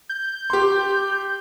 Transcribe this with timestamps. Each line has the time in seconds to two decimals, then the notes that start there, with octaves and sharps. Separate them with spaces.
0.09 G6
0.50 G4 C6